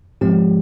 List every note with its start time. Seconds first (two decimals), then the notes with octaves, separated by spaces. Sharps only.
0.21 G#2 F3 G#3 C4 G4